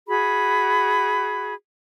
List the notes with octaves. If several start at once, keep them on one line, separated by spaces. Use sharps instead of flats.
F#4 G#4 B5